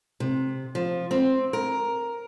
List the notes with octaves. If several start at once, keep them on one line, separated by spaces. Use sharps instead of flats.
C3
F3
C4
A#4